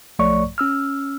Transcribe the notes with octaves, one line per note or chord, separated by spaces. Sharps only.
B1 F3 A3 C#5 D5 C#6
C#4 E6 F6